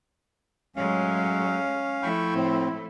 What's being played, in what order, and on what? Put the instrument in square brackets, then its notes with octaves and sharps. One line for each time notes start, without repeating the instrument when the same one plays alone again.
[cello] A2 G#3 [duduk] F#3 [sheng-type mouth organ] C#4 F5
[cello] F3 A3 [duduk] E4 [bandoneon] G5 B5 C#6
[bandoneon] A2 C4